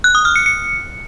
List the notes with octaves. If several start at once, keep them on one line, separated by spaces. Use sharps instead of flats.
F#6
D#6
F6
C#7
C#7